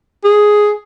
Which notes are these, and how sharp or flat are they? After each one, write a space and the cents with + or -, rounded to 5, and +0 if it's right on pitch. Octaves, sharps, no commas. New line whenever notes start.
G#4 +5